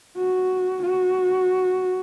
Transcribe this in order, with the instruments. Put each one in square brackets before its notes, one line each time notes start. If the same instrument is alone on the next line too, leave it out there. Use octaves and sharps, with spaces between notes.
[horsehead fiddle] F#4
F#4